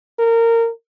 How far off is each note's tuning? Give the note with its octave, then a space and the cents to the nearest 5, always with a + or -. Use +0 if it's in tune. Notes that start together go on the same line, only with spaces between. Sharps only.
A#4 -20